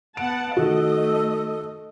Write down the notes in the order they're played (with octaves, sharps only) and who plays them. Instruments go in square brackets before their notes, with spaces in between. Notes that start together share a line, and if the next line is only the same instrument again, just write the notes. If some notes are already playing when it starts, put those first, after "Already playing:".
[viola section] B3 F#5 A5 [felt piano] D7
[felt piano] D#3 F#4 [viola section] A3 D#5 [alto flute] A4